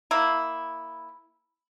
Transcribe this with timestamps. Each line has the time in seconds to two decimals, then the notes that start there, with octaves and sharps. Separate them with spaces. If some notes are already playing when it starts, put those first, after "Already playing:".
0.11 A#3 E4